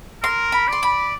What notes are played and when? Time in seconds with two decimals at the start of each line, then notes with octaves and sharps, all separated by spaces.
0.23 A#4 C6
0.52 B5
0.68 D5 C6
0.83 B5